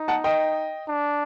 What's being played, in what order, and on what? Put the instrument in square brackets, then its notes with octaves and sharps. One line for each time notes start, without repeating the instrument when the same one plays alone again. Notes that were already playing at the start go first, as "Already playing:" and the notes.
Already playing: [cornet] D#4
[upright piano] F#5 A5
D#5 G5
[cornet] D4